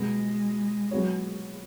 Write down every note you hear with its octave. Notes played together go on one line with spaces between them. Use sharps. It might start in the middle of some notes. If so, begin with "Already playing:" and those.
Already playing: B2 G#3 B3 G#4
F#3 B3 F#4 C#5